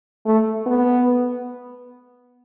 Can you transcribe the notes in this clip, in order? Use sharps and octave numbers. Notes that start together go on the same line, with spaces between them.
A3
B3